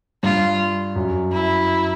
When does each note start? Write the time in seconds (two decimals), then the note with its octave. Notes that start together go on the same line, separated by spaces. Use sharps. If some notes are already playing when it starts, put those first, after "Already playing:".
0.23 G2 F4
0.96 F#2
1.32 E4